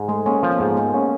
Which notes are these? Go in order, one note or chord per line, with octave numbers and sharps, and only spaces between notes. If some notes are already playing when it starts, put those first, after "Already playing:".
Already playing: G#2
G#3 A3
A#3 C#4
F3
B3
G#2
G#3 A#3
C#4